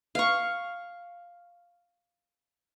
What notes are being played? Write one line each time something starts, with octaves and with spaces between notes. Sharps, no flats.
F5 C#6